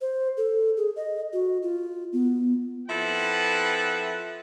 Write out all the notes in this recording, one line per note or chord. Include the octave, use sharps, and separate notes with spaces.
C5
A4
G#4
D#5
F#4
F4
B3
F3 C4 E4 A4 B4 F#5